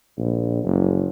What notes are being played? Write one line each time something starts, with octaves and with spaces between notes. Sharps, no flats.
A#1
F#1